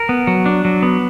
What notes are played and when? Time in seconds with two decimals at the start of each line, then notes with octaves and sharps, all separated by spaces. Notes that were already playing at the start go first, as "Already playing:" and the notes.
Already playing: A#4
0.09 B3
0.27 F#3
0.46 D4
0.65 F#3
0.83 B3